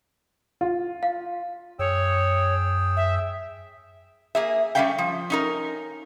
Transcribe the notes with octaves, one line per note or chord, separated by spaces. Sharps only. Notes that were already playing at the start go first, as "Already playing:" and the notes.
F4
F5
F#2 G#4 C#5 G5 E6
E5
A#3 G#4 E5
G3 A3 C#4 E5 F5 G5
F3
C#4 D#4 A#4